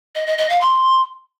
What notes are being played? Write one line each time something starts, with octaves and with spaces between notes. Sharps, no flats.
D#5
D#5
D#5
F5
C6